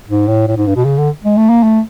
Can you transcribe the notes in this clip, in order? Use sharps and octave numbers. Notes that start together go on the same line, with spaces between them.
G#2
A2
A2
G#2
G2
B2
C#3
D3
G#3
A3
A#3
A3